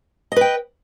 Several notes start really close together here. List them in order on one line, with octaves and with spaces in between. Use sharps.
D#5 B4 G5